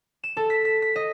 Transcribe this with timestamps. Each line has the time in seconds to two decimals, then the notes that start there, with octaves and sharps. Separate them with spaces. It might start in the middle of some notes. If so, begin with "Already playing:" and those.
0.24 E7
0.37 A4
0.50 B6
0.65 B6
0.82 B6
0.96 D#5